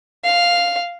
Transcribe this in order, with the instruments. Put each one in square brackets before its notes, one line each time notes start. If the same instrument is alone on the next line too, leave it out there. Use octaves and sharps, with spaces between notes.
[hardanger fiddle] F5